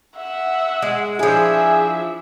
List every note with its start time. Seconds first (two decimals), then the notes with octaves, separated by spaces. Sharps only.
0.17 E5 F#5
0.82 G#3
1.19 F3 D4 E4 G#4 E5